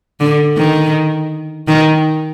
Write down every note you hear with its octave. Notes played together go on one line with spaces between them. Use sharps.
D3
D#3
D#3